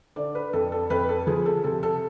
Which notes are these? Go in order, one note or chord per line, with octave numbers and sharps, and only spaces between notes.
D3 D5
B4
F2 A4
A4
F2 B4
A4
F3 G#4
A4
C3 A4
A4